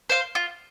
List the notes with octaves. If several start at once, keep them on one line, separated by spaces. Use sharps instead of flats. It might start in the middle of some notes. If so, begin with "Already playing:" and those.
C5 F5
F4